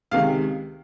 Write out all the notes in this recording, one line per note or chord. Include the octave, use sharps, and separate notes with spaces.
C#2 C3 D#3 G#3 F5